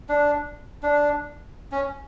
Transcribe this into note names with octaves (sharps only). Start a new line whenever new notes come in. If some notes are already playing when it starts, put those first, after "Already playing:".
D4
D4
C#4